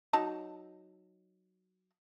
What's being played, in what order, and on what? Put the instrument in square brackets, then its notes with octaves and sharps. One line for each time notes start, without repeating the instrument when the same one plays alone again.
[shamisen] F#3 D#4 A5